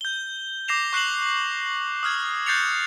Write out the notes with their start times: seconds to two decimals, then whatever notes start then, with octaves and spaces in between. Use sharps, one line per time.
0.01 G6 G7
0.68 D6 G6 A#6 C7 E7 F7
0.93 C#6 F#6 C7 E7 F#7
2.03 D#6 F6 G#6
2.46 F#6 G6 A6 C7 C#7 F7